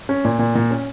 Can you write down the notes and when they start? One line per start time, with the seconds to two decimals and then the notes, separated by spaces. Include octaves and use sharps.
0.09 C#4
0.25 A#2
0.39 A#2
0.55 A#2
0.71 C#4